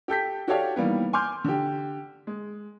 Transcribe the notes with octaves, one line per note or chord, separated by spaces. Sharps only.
G4 A4 G6 B6
F#4 G4 A4 C#5 D5 F5
D#3 E3 G3 A#3 B3
G#5 C6 D6 F6 G6
D3 G4
G#3